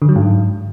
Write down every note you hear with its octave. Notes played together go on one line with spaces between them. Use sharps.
D3
F#3
G#2